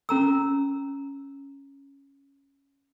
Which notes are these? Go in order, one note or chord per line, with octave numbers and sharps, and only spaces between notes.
C#4 A#5 E6